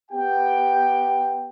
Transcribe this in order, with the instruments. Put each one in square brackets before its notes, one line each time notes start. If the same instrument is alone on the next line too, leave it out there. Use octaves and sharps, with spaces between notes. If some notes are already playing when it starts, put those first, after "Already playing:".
[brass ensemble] B3 G4 G5